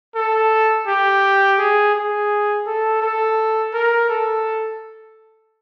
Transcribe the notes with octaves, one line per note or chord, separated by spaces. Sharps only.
A4
G4
G#4
G#4
A4
A4
A#4
A4